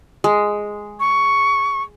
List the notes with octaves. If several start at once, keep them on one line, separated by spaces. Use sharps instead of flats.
G#3
C#6